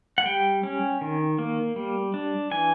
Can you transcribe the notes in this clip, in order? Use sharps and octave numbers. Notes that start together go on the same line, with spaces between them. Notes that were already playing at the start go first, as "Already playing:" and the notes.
F#5
G3 G5
C#4
D#3
A#3
G3
D4
E3 G#5